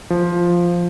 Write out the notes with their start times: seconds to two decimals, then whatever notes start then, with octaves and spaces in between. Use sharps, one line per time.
0.10 F3